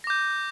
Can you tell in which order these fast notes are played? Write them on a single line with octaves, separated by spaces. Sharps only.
A#6 D6 G6